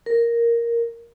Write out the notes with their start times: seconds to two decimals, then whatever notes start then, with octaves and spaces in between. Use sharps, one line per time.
0.06 A#4